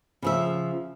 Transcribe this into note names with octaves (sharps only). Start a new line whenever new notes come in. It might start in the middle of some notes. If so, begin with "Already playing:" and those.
C#3 F3 E5